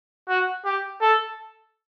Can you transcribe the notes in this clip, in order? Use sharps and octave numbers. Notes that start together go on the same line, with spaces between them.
F#4
G4
A4